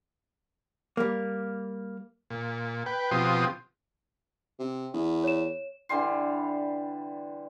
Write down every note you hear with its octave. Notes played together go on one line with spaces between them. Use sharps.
G3 A#3
A#2
B4 G5
B2 F3 C4 G4 C6 D#6
C3
E2
C#5 E7
D3 E3 G3 C6